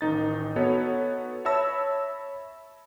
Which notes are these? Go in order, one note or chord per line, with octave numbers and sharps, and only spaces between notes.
A1 D#3 D#4 A6
B3 D#4 F#4 A4 B4 C#5
C#5 E5 A5 B5 E6 A#6